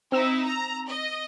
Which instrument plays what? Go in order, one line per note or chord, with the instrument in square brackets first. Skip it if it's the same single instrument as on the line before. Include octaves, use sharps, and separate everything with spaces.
[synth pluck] C4 E6 E7 [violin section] D#4 E4
[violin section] A#5
D#5